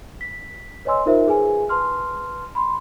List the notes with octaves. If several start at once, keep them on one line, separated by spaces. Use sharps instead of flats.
B6
B4 C#5 D#5 G#5 C6 E6
D#4 F4 A#4 C5 E5
G#4 B4 G#5
B4 A5 C6 F6
B5 C6